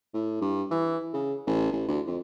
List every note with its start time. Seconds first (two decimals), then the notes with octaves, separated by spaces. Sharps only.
0.14 A2
0.42 G2
0.71 E3
1.14 C#3
1.47 A1
1.72 A1
1.88 D2
2.07 F2